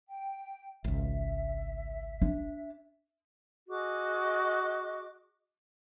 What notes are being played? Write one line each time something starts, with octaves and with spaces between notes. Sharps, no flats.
G5
G#1 C#2 E5
D4
F#4 G#4 D#5 D6